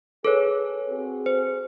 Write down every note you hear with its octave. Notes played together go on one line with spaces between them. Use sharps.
G#4 A4 B4 C#5
C4 F#4 G#4
C5